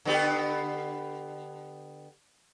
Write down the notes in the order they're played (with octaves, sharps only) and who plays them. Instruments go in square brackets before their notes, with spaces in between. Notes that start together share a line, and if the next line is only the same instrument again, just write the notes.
[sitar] D3 B3 G4